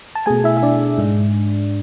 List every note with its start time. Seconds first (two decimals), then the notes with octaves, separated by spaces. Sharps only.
0.15 A5
0.26 B2 A3 G#4 G#5
0.44 E4 E5
0.57 E5
0.63 D4 D5
0.98 G#2 G#3